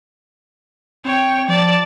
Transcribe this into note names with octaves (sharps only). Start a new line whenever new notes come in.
C4 C#5 G5
F3 D5 A5